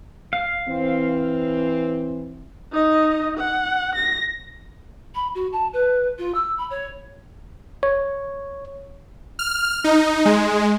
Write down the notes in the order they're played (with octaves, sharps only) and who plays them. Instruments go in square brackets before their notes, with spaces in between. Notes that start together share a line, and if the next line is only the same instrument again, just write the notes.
[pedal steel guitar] F5
[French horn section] E3 C4
[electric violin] D#4 D#5
F#5
A#6
[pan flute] B5
F#4
A5
B4
F4
E6
B5
C#5
[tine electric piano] C#5
[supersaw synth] F6
D#4
G#3